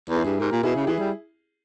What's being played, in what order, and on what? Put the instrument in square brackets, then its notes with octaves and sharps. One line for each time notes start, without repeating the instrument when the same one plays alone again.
[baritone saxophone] E2
[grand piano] E4 G#4
[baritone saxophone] G2
[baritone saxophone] G#2 [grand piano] G4 A#4
[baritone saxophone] A#2
[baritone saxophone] B2 [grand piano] E4 G#4
[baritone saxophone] C#3
[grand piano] G4
[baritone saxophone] E3 [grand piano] E4 G#4
[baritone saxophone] G3